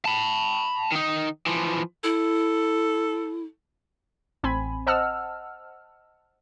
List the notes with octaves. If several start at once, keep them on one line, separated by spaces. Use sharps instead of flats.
A5 B5
D#3 D#4
E3 F3
E4 A4
A1 C4 G#5 B5
C5 D#5 F#5 A5 E6 F6